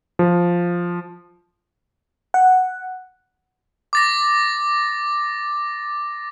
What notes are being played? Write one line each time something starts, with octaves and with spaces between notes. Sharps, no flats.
F3
F#5
D6 A6 A#6